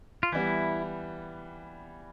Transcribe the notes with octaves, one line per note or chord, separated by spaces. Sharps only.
F4
E3 G3 B3 E4